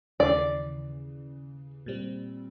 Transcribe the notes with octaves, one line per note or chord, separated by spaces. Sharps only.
D#2 C#3 E3 D5
A#2 G3 C4